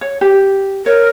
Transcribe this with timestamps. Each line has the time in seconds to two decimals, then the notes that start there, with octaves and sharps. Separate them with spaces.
0.01 C#5
0.21 G4
0.86 A#4 C#5